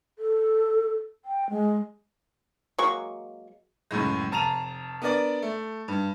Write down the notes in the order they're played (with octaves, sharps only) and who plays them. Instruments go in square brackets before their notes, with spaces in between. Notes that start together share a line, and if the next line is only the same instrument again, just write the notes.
[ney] A4
G5
G#3
[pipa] F#3 G#3 A#3 C#6
[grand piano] C#2 F#2 A2 G#3
F1 A5 A#5 D#7 F7
B3 D4 A#4 D5
A3
G2